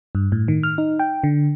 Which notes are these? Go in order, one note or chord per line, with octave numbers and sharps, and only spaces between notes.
G2
A2
D#3
F6
D#4
G5
D3